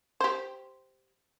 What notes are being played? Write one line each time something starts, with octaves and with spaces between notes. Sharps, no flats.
G4 C5